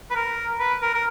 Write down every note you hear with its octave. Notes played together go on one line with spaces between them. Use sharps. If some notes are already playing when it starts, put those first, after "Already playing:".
B4
A#4
B4
A#4
A#4